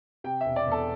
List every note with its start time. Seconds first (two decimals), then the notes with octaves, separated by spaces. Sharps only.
0.24 C3 G5
0.41 E1 E5
0.56 D5
0.67 E2 A4